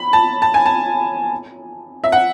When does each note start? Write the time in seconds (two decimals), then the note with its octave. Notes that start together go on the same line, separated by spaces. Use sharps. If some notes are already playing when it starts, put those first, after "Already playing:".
Already playing: B5
0.13 A5
0.42 A5
0.54 G#5
0.66 A5
2.04 E5
2.12 F#5